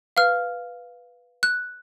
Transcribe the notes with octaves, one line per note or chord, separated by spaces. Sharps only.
B4 F5 F6
F#6